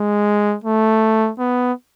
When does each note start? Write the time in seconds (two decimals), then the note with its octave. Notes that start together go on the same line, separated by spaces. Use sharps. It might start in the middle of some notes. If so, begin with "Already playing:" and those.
Already playing: G#3
0.64 A3
1.39 B3